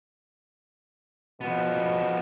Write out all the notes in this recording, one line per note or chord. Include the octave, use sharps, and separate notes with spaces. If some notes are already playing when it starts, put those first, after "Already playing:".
B2 F3 B3